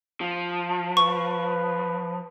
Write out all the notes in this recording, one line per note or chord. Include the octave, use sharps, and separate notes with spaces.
F3
B4 C#6